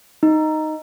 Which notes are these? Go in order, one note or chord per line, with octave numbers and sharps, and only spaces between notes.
D#4